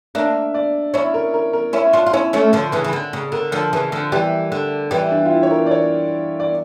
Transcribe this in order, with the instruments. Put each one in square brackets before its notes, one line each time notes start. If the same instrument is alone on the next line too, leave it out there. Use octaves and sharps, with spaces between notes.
[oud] A#3 D4 [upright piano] E5
[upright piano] D5
[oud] C#4 E4 [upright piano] C#5
[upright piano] A#4
A#4
A#4
[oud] C#4 E4 [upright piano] C#5
[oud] D4 F4
F4
[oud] C#4 E4 [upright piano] C#5
[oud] A3 C#4
D3 F3
C#3 E3
E3
D3
C#3
[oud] D3 [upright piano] A#4
[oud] D3 F3
C#3 E3
D3 F3
[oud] E3 G3 [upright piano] G4
[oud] D3
[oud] E3 G3 [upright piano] G4
[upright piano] D4
F4
E4
C#5
A#4
D5
C#5
D5